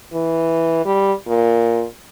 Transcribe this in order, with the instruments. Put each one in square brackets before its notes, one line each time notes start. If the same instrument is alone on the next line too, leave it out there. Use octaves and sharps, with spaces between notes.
[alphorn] E3
G3
A#2